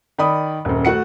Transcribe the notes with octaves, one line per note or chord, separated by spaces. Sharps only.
D#3 D5 B5 D#6
D#1 F#2
A3 F#4 F#5 C#7